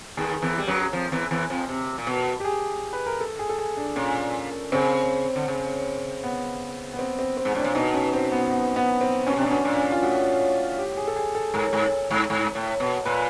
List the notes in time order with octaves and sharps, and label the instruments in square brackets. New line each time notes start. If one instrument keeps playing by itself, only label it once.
[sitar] D#2 D#3 [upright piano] G#4
[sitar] E2 E3
G3
F#2 F#3
F2 F3
E2 E3
E2 E3
F2 F3
C3
A#2
B2
[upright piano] G4
G#4
B4
A#4
A4
G#4
A4
G#4
D4
[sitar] A#2 [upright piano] C#4
[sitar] C#3 [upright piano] C4
[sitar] D3
C#3
[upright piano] B3
B3
C4
C4
C4
[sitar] G#2
[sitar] A2 [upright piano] D4
[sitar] A#2
[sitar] B2 [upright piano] D#4
[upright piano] C#4
C4
B3
B3
B3
C4
[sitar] B2 [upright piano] C#4
[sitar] C3 [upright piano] D4
[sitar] B2
[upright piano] C#4
[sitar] A#2 [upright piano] D4
[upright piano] C#4
F4
[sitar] A2 [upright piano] F#4
[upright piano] G4
G#4
A4
G#4
A4
[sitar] G#2 [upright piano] A#4
[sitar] G#2
G#2
G#2
A2
B2
[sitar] A#2 [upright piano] B4